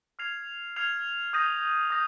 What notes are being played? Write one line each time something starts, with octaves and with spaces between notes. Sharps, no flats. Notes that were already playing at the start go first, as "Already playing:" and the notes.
F6 G#6 C7 F7
F6 G#6 C7 F7
D#6 G6 A#6 D#7
D#6 G6 A#6